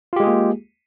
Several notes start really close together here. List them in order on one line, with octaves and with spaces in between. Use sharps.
F4 G4 G#3 G#4 A#3